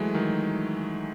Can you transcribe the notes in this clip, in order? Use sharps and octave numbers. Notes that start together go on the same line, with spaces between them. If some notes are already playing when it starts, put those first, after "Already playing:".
Already playing: E3 F#3 G#3 A3
D#3 F#3